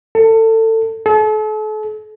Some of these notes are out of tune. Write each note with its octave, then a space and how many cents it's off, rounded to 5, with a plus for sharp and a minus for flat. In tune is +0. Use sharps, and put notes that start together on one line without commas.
A4 +25
A4 -40